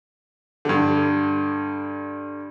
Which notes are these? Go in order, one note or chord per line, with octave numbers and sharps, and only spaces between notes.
G2 D3